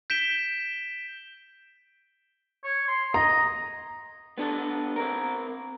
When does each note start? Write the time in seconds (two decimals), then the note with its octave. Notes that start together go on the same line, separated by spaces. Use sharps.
0.10 G6 B6 D7 E7 G7
2.64 C#5
2.88 C6
3.14 D#5 A#5
4.38 B3 D4 A4
4.96 C4 A#4